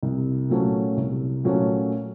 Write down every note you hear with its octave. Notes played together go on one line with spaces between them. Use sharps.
C2
A#2 F#3 A3 C#4
C2
A#2 F#3 A3 C#4